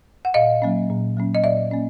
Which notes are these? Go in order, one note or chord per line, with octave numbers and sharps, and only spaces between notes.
F#5
A#2 D#5 F5
F#3 A#3 C#4
A#2
F#3 A#3 C#4
D#5
A#2 D5 E5
A#3 C#4